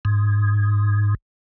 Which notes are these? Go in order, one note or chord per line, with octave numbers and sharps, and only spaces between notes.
G#2